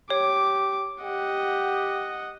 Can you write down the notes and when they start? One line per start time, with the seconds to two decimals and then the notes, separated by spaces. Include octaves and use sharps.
0.10 G4 C#5 D6
1.03 G4 D#5 F#5